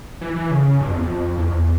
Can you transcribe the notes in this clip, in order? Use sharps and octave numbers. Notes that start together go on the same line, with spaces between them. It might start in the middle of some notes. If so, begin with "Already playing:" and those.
E3
E3
C#3
G2
F2
E2
F2
E2
F2
E2